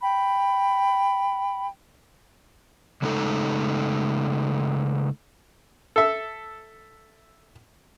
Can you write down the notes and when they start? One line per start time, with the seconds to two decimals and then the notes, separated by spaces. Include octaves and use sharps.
0.02 G5 B5
3.02 C#3 G#3 A3 D#4 A4
5.96 A4 E5